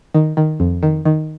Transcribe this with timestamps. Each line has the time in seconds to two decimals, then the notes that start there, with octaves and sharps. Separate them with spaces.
0.14 D#3
0.37 D#3
0.60 F2
0.83 D#3
1.05 D#3